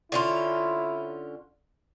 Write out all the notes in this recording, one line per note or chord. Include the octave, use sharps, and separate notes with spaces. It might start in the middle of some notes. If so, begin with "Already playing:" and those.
D3 C#4 E4 F4